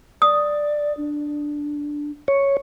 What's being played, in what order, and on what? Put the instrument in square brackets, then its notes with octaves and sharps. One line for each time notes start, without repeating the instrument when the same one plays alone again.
[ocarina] D5 [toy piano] D#6
[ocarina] D4
[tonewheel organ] C#5